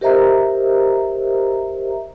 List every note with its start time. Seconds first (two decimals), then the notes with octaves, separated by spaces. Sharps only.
0.01 G4 A#4 C5 D#5 E5 A#5